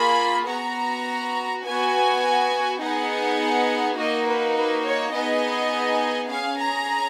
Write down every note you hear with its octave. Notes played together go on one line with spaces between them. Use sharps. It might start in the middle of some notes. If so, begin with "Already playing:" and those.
Already playing: A#3 F4 G#4 B5
B3 F#4 A#5
B3 F#4 G#5
B3 D#4 G#4 F#5
A#3 D#4 F#4 D#5
B4
B4
C#5
B3 D#4 G#4 D#5
C#4 G#4 F5
A#5